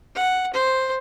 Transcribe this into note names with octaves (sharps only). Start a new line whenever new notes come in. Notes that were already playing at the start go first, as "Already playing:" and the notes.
F#5
C5